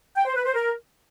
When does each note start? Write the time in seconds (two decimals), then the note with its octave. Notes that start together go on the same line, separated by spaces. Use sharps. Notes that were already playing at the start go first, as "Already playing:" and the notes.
0.16 G5
0.26 C5
0.36 B4
0.45 C5
0.55 A#4